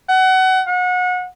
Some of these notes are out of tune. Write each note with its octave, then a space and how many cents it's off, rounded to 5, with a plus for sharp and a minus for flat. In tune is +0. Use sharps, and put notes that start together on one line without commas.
F#5 +25
F#5 -30